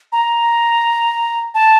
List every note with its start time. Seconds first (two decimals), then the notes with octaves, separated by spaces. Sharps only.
0.12 A#5
1.54 A5